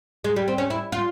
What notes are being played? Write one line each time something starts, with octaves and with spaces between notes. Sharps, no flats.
G#3
G3
C4
C#4
E4
F4